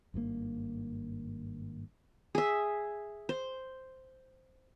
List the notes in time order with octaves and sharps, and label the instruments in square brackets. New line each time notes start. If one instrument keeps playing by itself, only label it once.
[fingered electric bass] G#1 G2 D#3 A#3
[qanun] G#4 E5
C5